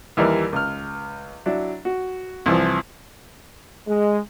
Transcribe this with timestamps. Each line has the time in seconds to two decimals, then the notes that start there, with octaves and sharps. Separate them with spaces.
0.17 D#2 E3 G3 A#4 D5
0.53 C#2 F6
1.46 F#3 D4 E4
1.85 F#4
2.46 C2 E3 F3
3.87 G#3